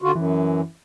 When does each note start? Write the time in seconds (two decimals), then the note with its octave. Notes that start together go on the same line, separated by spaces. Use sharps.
0.02 D3 F4 F#4
0.15 F#2 E3